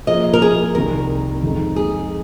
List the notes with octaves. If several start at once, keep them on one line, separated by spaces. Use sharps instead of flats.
F3 A#3 F4 G#4 D#5
A#4
G#4
C2 C3 D#3 A#4
F2 D#3 G#3 D#4
G#4